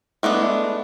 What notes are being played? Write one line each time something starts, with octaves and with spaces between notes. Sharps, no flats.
G#3 A3 B3 D4